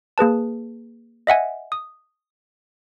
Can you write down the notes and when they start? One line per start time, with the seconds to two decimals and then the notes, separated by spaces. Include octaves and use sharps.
0.18 A#3 G#4 B4 A5
1.27 D#5 E5 F#5 G#5
1.72 D#6